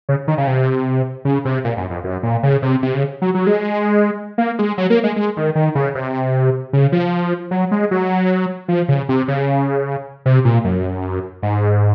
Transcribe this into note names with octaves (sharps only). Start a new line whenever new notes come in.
C#3
D#3
C#3
C3
C#3
C3
A#2
F#2
F2
F#2
A#2
C#3
C3
C3
C#3
F#3
F#3
G#3
A#3
G#3
F#3
A#3
G#3
G#3
D#3
D#3
C#3
C3
C#3
F3
F#3
G#3
F#3
F3
C#3
C3
C#3
C3
A#2
F#2
G#2